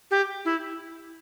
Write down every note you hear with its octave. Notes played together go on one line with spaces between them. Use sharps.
G4
E4